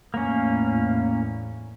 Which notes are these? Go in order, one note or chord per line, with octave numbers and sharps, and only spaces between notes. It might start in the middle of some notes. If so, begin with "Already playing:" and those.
E2 A2 A#3 C#4